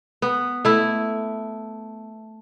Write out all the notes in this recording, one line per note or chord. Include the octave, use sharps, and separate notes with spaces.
B3
A3 E4